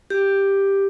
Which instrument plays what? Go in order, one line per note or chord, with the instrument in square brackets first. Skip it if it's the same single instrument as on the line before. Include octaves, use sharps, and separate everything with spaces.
[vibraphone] G4